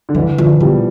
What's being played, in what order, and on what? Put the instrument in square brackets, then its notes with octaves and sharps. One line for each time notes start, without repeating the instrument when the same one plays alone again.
[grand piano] D3
[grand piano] E3 [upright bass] G3
[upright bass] D3 [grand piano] F3
[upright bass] B2 [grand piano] G3